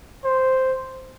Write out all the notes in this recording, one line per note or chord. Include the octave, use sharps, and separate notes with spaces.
C5